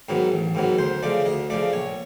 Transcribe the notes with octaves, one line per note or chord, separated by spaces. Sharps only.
G#2 D#3 F#3 B3
A1
G#2 D#3 F#3 B3
D2 C5
C#3 F3 A3 D5
D2 D#5
C#3 F3 A3 D5
A#1 C#5